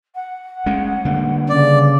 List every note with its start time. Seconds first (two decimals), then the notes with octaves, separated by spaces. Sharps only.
0.15 F#5
0.66 G#3 C#4
1.05 D3 G3 A#3
1.49 C#3 D5